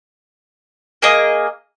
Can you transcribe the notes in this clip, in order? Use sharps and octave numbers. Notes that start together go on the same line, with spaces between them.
A#3 G#4 D#5